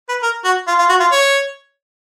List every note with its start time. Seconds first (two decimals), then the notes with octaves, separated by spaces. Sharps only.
0.09 B4
0.23 A#4
0.45 F#4
0.67 F4
0.79 F4
0.89 F#4
1.00 F4
1.12 C#5